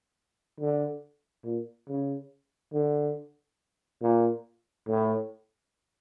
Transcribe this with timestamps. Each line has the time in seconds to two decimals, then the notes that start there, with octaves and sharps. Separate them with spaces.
0.60 D3
1.45 A#2
1.88 C#3
2.73 D3
4.02 A#2
4.88 A2